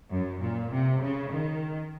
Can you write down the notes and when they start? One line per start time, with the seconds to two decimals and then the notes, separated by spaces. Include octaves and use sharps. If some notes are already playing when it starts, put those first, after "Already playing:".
0.10 F#2
0.41 A#2
0.71 C3
1.01 C#3
1.32 D#3